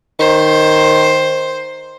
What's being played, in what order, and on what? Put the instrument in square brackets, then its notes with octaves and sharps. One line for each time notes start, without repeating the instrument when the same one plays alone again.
[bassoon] D#3 [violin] C5